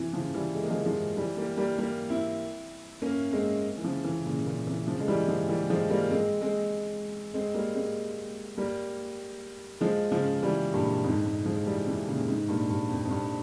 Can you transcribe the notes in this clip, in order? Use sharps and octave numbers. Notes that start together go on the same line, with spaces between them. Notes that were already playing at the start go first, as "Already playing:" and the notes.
Already playing: C3 E3
C#3 F3
E3 G3
G#3
A#3
F3 G#3
F3 G#3
E3 G3
G3 A#3
G3 A#3
G3 A#3
C4 E4
A#3 C#4
G#3 C4
E3
C#3 F3
C3 E3
A#2 C#3
A#2 C#3
C3 E3
C#3 F3
G#3
E3 G3
F3 G#3
E3 G3
F3 G#3
G3 A#3
G#3 C4
G#3 C4
G#3 C4
G3 A#3
G#3 C4
G3 A#3
F3 G#3
C#3 F3
E3 G3
G2 A#2
F2 G#2
G#2 C3
F3 G#3
E3 G3
C3 E3
A#2 C#3
G#2 C3
G2 A#2
G2
F2
F2
G2